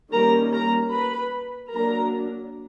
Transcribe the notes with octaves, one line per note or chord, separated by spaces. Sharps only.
D#3 G3 A#3 C#4 A#4 A#5
A#4 A#5
B4 B5
F#3 A#3 D4 A#4 A#5